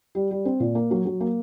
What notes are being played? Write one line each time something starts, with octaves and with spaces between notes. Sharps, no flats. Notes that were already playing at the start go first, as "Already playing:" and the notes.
G3
G3
C4
A#2
A#3
F#3
F#3
A#3